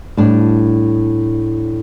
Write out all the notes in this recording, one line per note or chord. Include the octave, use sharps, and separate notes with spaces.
A2 G3 D4